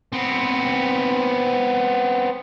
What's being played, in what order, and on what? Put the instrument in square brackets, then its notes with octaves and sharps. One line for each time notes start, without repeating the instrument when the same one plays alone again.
[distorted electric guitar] B3 C4